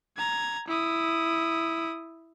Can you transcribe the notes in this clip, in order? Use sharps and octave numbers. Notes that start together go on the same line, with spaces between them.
A#5 G#6
E4 D#6